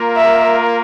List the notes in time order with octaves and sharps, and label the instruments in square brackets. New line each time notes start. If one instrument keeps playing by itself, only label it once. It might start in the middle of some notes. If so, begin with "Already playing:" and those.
Already playing: [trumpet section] A#3 F4 A#4
[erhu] E5